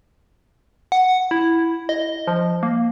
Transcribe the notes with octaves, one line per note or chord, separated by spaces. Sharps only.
F#5
E4
D#5
F3
A#3